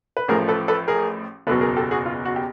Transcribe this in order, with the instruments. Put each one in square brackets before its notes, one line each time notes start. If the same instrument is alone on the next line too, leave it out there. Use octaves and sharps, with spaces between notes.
[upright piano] B4
A1 A2 F3 G#4 A#4
A4 B4
A4 B4
G#4 A#4
F#1 E2 B2 F#3 A4 B4
G#4 A#4
G4 A4
F#4 G#4
F4
F#4
G4